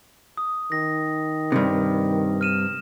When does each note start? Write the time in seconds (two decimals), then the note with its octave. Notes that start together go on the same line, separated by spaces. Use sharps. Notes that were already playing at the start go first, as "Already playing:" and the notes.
0.37 D#6
0.72 D#3 A#6
1.52 G2 C3
2.41 F6 D#7 E7